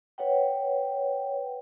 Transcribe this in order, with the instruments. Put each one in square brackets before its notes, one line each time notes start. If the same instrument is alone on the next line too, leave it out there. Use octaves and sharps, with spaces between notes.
[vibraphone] B4 C#5 F#5 G5